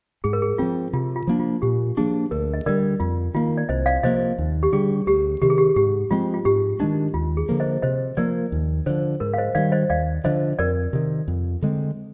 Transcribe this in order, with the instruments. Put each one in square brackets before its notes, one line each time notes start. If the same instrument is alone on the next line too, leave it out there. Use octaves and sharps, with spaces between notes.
[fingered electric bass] G#2 [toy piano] G#4
[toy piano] A#4
G#4
[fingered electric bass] F3 C4 [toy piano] F4
[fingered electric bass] C3 [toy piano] F4
[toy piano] F4
[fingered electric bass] F3 A#3 D4
[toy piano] F4
[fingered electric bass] A#2 [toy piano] G4
[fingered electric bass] F3 A#3 D4 [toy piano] G#4
[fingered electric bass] D2 [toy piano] A#4
[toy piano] D#5
[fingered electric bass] D3 G3 [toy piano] A#4 D5
[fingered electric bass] F2 [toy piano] F4
[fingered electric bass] D#3 A#3 [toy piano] F4
[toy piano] D5
[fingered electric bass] C2 [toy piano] C5 D#5
[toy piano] D5 F5
[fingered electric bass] C3 F3 A#3 [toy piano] C5 D#5
[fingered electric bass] D#2
[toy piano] G4
[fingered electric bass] D3 G3 [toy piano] G#4
[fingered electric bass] D2 [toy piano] G4
[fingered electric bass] C3 D#3 [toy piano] G4
[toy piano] G#4
G4
[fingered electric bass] G#2 [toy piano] G4
[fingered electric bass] F3 G#3 C4 [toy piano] F4
[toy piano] F4
[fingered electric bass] G#2 [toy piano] G4
[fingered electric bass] D#3 G#3 D4 [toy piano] D#4
[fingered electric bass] D#2 [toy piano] F4
[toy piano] G#4
[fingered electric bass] D3 F3 A#3
[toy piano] C5 D#5
[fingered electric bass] C3 [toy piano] C5 D#5
[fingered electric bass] F3 A#3 [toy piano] A#4 D5
[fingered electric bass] D#2
[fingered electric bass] D3 F3 [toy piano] C5
[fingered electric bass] G#2 [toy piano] A#4
[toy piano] F5
C5 D#5
[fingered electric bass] D#3 G3 [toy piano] D5 F5
[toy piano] C5 D#5
[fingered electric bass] D#2 [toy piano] D5 F5
[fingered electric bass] D3 F3 [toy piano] C5 D#5
[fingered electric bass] F2 [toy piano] A#4 D5
[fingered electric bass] C3 D#3
F2
D3 G#3 C4